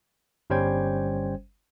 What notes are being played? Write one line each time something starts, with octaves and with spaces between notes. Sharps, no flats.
G1 G3 C#4 C5 G5 G#6